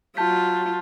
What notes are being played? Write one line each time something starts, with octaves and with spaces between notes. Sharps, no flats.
F#3 F4 A5 G6 B6